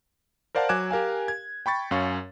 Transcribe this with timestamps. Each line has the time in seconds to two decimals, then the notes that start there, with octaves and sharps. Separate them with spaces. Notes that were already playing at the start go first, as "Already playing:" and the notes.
0.55 A#4 C5 D5 F5 F#5 A5
0.69 F#3 G#5 D6 F#6 G#6 E7
0.91 G4 A#4 F5 G#5
1.28 G#6
1.66 G5 B5 C#6 A6
1.91 F#2 C#4 F5 C#6